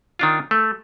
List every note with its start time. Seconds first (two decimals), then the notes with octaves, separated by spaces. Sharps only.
0.19 D#3 D4 F4
0.51 A3